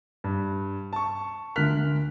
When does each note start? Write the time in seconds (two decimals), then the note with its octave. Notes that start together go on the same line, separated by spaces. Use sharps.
0.24 G2
0.93 A5 C#6
1.56 D2 D3 A#4 F6 F#6 B6